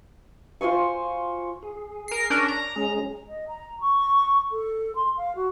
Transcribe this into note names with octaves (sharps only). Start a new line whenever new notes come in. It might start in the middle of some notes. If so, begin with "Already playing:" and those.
F4 C5 G#5 C#6
G#4
A#4 C7
C#4 D4 A#4
A#5
G#3 C#4 G#4
D#5
A#5
C#6
A4
C6
F5
F#4